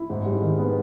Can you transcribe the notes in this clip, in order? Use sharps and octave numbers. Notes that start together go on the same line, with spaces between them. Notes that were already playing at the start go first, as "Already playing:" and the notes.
Already playing: E4
G#2
G3
D#3
B3